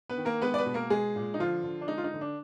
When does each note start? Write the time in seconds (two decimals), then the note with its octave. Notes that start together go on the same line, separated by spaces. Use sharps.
0.09 B3 B4
0.18 D#3
0.25 A#3 A#4
0.42 G#3 B3 B4
0.54 D5
0.58 B3 B4
0.66 B2
0.74 A#3 A#4
0.90 G#3 G#4
1.16 A#2
1.34 D#4
1.39 D3 F3 F4
1.64 D3
1.81 D4
1.88 G#3 D#4
1.98 F4
2.04 D#4
2.13 D3
2.21 D4